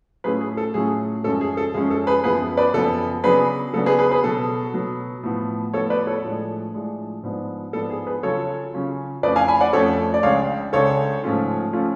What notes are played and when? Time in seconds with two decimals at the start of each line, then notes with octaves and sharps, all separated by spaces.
0.24 A2 F#3 A3 C#4 F4 G#4 B4
0.41 G#4
0.57 A4
0.74 A2 F#3 A3 C#4 F4 G#4
1.24 F#2 F3 G#3 C#4 A4
1.41 G#4
1.57 A4
1.74 F#2 F3 G#3 C#4 G#4
1.91 A4
2.07 G#4 B4
2.24 F#2 F3 B3 G#4 B4
2.57 B4 D5
2.74 F#2 F3 B3 A4
3.24 C#3 F#3 B3 D4 G#4 B4
3.74 C#3 F#3 B3 D4 A4
3.86 G#4 B4
3.99 G#4 B4
4.11 G#4 B4
4.24 B2 F#3 B3 A4
4.74 B2 F#3 B3
5.23 A2 F3 B3
5.74 A2 F3 B3 A4 C#5
5.90 B4 D5
6.07 A4 C#5
6.24 A2 F3 G#3 D4
6.74 A2 F3 G#3 D4
7.23 G#2 F3 B3 D4
7.73 G#2 F3 B3 D4 A4
7.90 G#4
8.07 G#4 B4
8.23 C#3 F#3 C#4 F4 A4 C#5
8.73 C#3 F#3 C#4 F4
9.23 F2 F3 A3 C#4 B4 D5
9.36 F5 G#5
9.48 G#5 B5
9.60 D5 F#5
9.73 F2 F3 A3 C#4 A4 C#5
10.14 D5
10.23 C#2 C#3 G#3 D4 C#5 F5
10.73 C#2 C#3 G#3 D4 A4 C#5
11.23 G#2 F3 A3 C#4 F4
11.73 F3 A3 C#4 F4